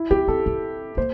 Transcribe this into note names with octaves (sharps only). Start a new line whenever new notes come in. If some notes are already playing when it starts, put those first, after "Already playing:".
Already playing: E4
C4 G4
C4 A4
C4
A#3 C5